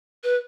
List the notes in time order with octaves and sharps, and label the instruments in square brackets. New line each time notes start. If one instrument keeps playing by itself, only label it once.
[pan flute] B4